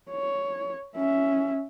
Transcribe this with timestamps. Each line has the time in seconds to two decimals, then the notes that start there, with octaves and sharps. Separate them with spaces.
0.11 C#5
0.96 C#4 E5